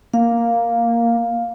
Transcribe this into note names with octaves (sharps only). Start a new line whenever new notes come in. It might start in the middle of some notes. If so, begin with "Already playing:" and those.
A#3 F5